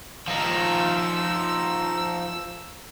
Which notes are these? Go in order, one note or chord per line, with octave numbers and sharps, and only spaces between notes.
F3 D#4 E6